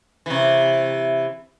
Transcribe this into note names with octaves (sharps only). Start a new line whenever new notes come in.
C3 E3